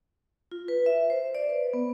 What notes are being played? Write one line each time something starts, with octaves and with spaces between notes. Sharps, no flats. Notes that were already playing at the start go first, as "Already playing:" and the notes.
F4
B4
E5
C5
D5
B4
B3